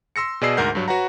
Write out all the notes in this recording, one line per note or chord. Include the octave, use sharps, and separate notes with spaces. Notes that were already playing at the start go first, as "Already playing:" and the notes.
C6 E6 A#6 C#7
B2 G#4 D5 D#5 E6 C7
D2 G#2 A#4 F#5 G6 C7
G2 F#3
F#4 B4 C#5 F#5 A#5